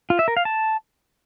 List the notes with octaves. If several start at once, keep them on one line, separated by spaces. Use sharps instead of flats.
F4
E5
A#4
F5
A5